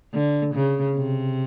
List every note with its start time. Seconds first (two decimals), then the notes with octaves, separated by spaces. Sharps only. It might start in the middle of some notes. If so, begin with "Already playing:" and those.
0.14 D3
0.54 C#3
0.95 C3